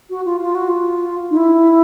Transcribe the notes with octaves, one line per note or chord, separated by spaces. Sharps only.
F#4
F4
F4
F#4
F4
D#4
E4